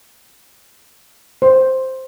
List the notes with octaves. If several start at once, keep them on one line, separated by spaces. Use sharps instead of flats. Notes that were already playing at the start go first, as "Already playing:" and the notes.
C5